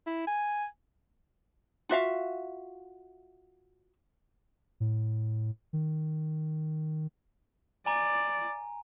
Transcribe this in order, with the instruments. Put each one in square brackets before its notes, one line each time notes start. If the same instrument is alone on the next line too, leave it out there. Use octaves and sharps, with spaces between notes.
[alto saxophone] E4
G#5
[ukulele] F4 F#4 E5 F5
[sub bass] A2
D#3
[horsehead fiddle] D5 [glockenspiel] G#5 A#5